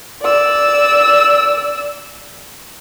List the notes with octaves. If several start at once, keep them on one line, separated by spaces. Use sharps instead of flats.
D5 E6